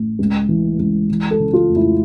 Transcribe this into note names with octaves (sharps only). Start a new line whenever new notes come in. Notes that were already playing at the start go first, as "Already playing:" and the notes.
Already playing: A1
C#2
E3
C#2
E3
A4
C#3
F4
F1
E4